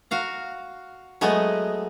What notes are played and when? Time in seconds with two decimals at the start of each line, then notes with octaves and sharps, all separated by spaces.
0.11 F#4 F5 A#5
1.21 F#3 G#3 A3 B3 D#5